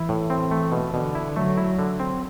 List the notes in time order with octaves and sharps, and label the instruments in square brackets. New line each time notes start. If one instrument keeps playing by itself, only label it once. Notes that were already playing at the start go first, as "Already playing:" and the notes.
Already playing: [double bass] E3 [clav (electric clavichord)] E4
[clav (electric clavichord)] A2
C4
[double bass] E3 [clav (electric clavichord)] A3
[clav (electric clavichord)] B2
[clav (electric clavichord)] B2 [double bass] D3
[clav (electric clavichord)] E4
[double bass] F#3 [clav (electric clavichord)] A3
[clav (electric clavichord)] E4
D3
C4